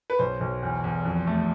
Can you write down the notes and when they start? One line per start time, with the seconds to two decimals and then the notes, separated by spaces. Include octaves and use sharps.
0.10 B4
0.19 B1 C5
0.41 B1
0.63 E2
0.84 E2
1.05 F2
1.27 A3